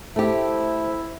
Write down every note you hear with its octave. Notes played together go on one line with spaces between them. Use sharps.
A3 E4 G4 C5